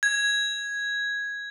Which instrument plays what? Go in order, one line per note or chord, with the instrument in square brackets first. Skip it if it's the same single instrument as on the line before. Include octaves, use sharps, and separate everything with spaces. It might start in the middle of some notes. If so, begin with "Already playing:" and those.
[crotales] G#6